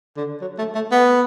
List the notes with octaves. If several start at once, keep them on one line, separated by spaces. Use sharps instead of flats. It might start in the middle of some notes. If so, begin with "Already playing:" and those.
D3
F#3
A3
A3
B3